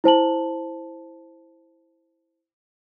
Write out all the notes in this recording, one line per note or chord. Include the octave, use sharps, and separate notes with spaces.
E4 C5 A5 F#7